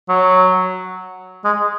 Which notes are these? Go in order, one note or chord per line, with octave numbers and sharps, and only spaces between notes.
F#3
G#3